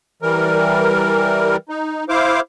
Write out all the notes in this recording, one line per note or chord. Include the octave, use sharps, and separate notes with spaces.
E3 G3 A#4
D#4
E4 C5 F5 D6